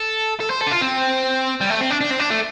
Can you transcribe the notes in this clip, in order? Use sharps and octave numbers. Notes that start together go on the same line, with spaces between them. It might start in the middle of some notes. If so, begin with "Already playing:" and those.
Already playing: A4
A4
C5
A4
D4
F4
C4
G3
A3
C4
D4
D4
C4
D4
A3